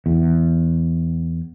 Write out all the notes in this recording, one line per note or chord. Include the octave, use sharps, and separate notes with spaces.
E2